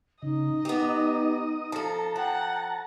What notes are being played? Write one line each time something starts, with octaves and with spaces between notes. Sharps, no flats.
C#3 D#4 D#5
B3 G4 D#6
F3 A4 A5 A#5
F3 F#5 G5